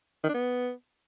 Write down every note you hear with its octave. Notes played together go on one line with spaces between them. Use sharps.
D#3
D4
B3